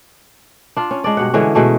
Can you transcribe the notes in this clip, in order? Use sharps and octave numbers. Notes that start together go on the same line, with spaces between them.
D4 F4
C#4
G#3 D4 D5
G2 B2 F#5
D3 E3 G#3 C#4
B2 G#3 A3